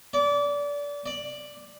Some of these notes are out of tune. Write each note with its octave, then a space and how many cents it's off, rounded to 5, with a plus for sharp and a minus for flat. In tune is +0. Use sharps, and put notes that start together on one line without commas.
D5 -25
D5 +10